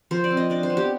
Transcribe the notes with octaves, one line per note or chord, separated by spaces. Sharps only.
F3 C5
D5
C4
D#5
D4 D5
C5
B3
G4